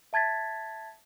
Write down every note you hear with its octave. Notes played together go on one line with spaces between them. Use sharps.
E5 A5 G#6 A6 B6